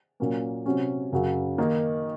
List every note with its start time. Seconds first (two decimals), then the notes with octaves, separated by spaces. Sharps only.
0.20 A#2 F#3 A#3 C#4
0.66 C3 F#3 C#4
1.12 F#2 C#3 F#3
1.58 D#3 A#3 D#4